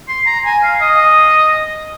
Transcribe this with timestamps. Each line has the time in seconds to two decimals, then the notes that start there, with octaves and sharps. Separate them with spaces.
0.08 C6
0.26 A#5
0.45 G#5
0.63 F5
0.81 D#5